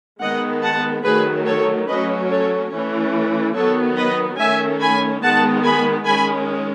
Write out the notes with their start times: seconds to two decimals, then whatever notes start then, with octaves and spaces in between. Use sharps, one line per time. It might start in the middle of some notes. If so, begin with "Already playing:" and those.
0.21 D#3 G#3 B3 D#5 F#5
0.63 F#5 A5
1.04 D#3 F#3 A3 G#4 B4
1.46 A4 C#5
1.88 F#3 A3 C#4 B4 D#5
2.30 A4 C#5
2.72 E3 A3 C#4
3.55 D#3 F#3 B3 A4 C#5
3.97 B4 D#5
4.39 D#3 A3 C#4 E5 G#5
4.80 G#5 B5
5.22 D#3 G#3 B3 F#5 A5
5.64 G#5 B5
6.05 D#3 G#3 C#4 G#5 B5